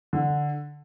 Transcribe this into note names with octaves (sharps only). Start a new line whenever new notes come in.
D3